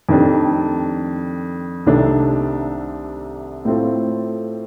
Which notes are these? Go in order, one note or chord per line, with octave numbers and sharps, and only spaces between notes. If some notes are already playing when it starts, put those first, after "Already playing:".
F2 D#3 A3 D4 G4
C2 C3 D#3 A3 D4
A2 A3 C4 F4